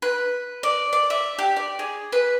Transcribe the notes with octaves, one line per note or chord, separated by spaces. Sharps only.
B4
D5
D5
E5
G4
D5
G#4
B4